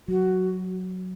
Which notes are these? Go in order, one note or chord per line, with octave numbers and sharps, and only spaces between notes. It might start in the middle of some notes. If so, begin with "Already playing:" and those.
F#3 F#4